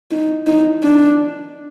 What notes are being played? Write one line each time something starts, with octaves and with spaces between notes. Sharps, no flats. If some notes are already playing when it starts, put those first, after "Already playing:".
D#4
D#4
D4